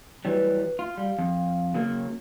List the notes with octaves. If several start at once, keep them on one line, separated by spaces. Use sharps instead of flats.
E3 F#3 G3 B4
F4
G3 F5
F2
C#3 F#3 A#3